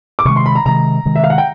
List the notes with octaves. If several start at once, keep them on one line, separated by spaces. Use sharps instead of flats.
D6
C3 D#3 G#3 C#6
C6
B5
A#5
C3 D#3 G#3 A#5
C3 D#3 G#3
E5
F5
F#5
G5